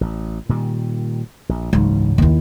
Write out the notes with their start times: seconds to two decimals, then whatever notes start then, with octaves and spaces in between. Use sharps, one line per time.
0.01 A1
0.49 A#2 D#3 G3
1.49 A#1
1.73 F#1 C#2 G#2 E3 F#3
2.18 D#2 E4